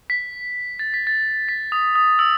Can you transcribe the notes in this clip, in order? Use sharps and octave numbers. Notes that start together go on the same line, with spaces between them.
B6
A6
B6
A6
B6
D#6
D#6
E6